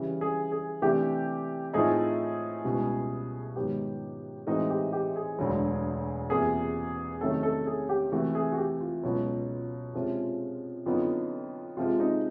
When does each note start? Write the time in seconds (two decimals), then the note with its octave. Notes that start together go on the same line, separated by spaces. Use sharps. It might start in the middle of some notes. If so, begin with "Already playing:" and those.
Already playing: C#3 E3 G3
0.21 G#4
0.52 G#4
0.82 C3 E3 A3 D4 G4
1.73 A2 F3 A3 C4 D#4 G#4
2.65 C#2 B2 G3
3.56 G#2 D#3 F#3 B3 G4
4.47 A2 E3 G#3 C4 D#4 F#4
4.70 G4
4.93 G4
5.16 G#4
5.39 E1 D2 D3 F#3
6.30 E2 C3 F3 A#3 G#4
7.21 C3 D#3 F#3 A3 C#4 A4
7.43 A4
7.67 G#4
7.89 G4
8.12 C3 E3 A3 F#4
8.35 G#4
8.52 F#4
8.58 G4
8.81 F4
9.03 C#2 B2 F#3
9.94 C3 F3 G#3 C#4
10.86 F2 D3 F#3 B3 D#4 F4
11.77 C3 F3 G#3 F4
12.00 D#4